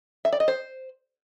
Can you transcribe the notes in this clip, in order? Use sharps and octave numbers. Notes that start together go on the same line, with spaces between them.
E5
D5
D#5
C5